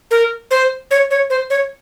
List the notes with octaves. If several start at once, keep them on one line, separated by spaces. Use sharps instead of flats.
A#4
C5
C#5
C#5
C5
C#5